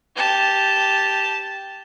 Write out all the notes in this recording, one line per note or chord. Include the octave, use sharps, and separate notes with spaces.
G4 A5